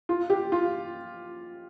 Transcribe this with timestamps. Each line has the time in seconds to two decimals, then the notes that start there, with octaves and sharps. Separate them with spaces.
0.09 F4
0.30 G4
0.52 F4